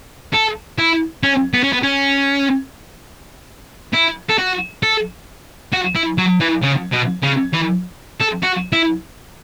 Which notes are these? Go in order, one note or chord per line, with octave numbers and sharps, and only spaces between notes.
A4
E4
C#4
B3
C#4
B3
C#4
E4
A4
F#4
A4
F#4
E4
F#3
E3
C#3
B2
C#3
E3
A4
F#4
E4